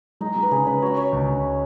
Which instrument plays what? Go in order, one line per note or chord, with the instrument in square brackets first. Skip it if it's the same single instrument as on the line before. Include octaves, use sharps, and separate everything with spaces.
[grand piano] G#3 [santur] D#4
[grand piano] G#3
[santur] B4
[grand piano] C#3 [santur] G#4
[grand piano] C#3 [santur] B4
[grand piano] F#4 [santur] C#5
[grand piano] F#4 [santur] C#5
[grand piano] C#2
C#2